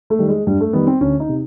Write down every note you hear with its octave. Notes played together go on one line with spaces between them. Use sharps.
A3
D#3 G3
G#3
G2 G3
A3
D#3 G3 B3
C4
D2 C#4
D#4
C3